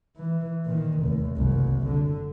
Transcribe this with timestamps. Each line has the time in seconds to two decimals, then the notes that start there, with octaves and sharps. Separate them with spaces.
0.17 E3
0.66 A#2 D#3
1.00 F1 D#2
1.37 F#1 C2
1.87 D3